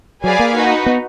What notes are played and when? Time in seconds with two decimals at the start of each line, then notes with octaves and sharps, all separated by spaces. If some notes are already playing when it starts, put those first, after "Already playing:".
0.23 F#3 G#4 B4 D5 F5 G#5
0.39 A#3
0.55 D#4 F#4 B4
0.86 B3